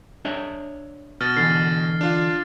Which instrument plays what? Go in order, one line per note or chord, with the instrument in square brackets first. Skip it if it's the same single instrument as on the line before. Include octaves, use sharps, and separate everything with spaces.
[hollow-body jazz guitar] D4 C#5 E5
[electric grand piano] B2 [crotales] F6 A6
[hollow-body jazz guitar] D3 E3 [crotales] F6 A6 C7
[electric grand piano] D4 F4 F5